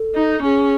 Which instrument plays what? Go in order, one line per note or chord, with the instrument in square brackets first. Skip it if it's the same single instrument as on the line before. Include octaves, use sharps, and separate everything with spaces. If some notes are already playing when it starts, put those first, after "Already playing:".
Already playing: [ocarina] A4
[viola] D#4
[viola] C#4 [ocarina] G#4